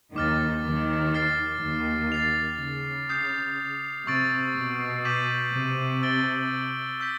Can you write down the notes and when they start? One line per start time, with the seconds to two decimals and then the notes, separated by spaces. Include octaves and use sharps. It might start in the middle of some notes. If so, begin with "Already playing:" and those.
0.16 D#2 D#3 D6 F6 A6
0.65 D#2 D#3
1.14 F6 A6 C7
1.62 D#2 D#3
2.12 A6 C7 F7
2.61 C#3
3.09 D#6 G6 C7
4.07 C3 C#6 E6 A6 D7
4.56 B2
5.05 D6 G6 B6 D#7 F#7
5.53 C3
6.02 E6 A6 D7 G7
7.00 E6 G6 B6